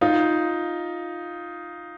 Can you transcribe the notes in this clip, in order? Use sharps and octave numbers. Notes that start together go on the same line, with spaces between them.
D#4 F4